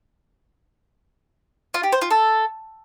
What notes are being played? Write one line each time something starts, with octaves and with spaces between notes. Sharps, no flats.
F4
G4
C5
F4
A4